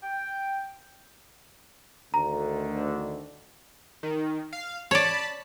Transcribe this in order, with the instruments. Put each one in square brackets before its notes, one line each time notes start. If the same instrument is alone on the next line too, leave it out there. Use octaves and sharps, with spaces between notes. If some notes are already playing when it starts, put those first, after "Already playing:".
[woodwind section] G5
[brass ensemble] D2 D3 D#3 [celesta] A#5
[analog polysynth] D#3
F5
[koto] C#5 D5 [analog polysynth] A5 B5